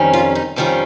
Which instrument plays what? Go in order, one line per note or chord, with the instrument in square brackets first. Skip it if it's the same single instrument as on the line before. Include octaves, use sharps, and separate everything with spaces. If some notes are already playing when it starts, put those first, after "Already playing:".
Already playing: [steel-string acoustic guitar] F2 D#3 G3 C#4
F4
D#4
F2 D#3 G3 C#4 F4